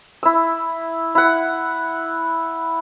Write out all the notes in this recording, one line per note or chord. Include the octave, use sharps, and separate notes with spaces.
E4 E6
E4 F#5